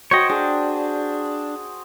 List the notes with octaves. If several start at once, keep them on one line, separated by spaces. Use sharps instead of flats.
F#4 C5 C#5 D#5 G5
D4 G#4